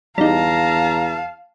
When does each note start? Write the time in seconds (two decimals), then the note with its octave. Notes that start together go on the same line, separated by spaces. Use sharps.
0.18 E2 G3 D#4 F5 A5 A#5